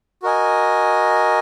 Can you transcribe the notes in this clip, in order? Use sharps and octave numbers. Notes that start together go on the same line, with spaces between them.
F#4 A#4 D#5 G#5